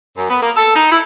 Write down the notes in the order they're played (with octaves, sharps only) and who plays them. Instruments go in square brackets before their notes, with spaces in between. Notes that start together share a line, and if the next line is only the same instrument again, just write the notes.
[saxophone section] F#2
B3
A#3
A4
D#4
E4